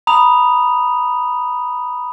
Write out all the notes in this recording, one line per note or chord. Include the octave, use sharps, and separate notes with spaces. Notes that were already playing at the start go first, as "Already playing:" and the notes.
A#5 B5 D#6 F7